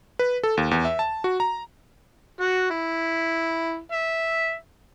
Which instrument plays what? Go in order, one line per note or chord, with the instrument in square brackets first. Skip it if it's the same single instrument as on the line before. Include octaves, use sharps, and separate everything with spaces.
[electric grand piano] B4
A4
D#2
E2
E5
A5
F#4
A#5
[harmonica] F#4
E4
E5